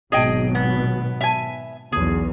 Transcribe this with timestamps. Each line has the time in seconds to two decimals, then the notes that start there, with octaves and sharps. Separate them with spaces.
0.12 G#1 B2 F#3 G#4 D#5 G5
0.55 B3
1.21 E5 G#5
1.92 B1 E2 G#4